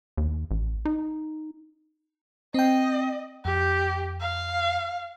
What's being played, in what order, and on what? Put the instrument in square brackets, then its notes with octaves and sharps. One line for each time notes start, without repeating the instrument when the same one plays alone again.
[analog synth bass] D#2
A1
D#4
[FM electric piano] C4 G5 [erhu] D#5
[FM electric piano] F2 [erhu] G4
[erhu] F5